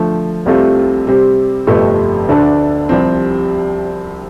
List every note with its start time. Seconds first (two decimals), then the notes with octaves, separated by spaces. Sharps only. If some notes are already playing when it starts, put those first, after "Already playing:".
Already playing: D3 F3 A3
0.46 C2 C3 A3 C4 F4
1.07 C3 G3 C4 G4
1.67 G1 F2 C3 F3 A3
2.29 D2 D3 A3 D4 A4
2.89 C2 C3 F3 C4